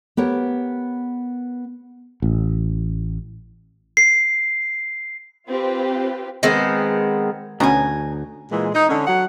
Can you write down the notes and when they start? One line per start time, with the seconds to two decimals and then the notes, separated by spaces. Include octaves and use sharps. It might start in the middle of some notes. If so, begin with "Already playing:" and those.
0.17 B3 G4 A#4 C#5
2.22 A1
3.97 C7
5.49 C4 F4 G4 B4
6.43 D#3 G#3 B3 C4
7.60 D2 B2 C#4 G#5 A#5
8.51 A#2 E3 G#3
8.74 D#4
8.88 D3 C#4
9.06 F#3 F#5